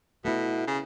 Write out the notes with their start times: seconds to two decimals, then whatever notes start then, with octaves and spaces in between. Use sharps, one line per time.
0.25 B2 A3 E4
0.67 C#3